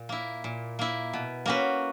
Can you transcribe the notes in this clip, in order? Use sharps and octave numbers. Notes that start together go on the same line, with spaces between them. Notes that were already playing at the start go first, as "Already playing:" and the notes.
Already playing: A#2
A#3 E4
A#2
A#3 E4
B2
A#3 C#4 F#4 B4